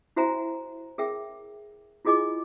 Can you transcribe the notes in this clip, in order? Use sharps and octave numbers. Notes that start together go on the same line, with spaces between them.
E4 F#4 C5 E5 G#5 A#5
G#4 A#4 E5 G5
E4 F4 G#4 D#5 G#5 D6